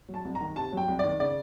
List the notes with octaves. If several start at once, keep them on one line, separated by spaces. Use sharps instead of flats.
F#3
A5
C2
A#5
D#3
C3 A5
F#3 G5
C2
D#3 D5
C#3 D5